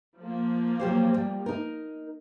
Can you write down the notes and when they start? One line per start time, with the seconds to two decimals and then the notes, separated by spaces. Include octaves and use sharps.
0.18 F3 A#3
0.80 F#3 G4 C5
1.14 G3
1.46 D#4 A#4